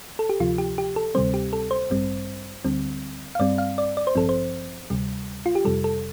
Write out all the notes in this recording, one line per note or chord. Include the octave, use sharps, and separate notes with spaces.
A4
G4
D2 C3 F3 F4
G4
G4
A4
D2 C3 G3 C4 C5
G4
A4
C5
A1 G2 G3 C4
D2 D3 G3 C4
F5
G2 G3 C4 D5
F5
D5
D5
C5
A1 G2 F3 C4 A4
C5
D2 C3 G3
F4
G4
F2 C3 G3 A4
A4